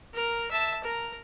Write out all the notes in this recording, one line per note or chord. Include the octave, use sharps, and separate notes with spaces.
A#4 A#5
E5 A5
A#4 A#5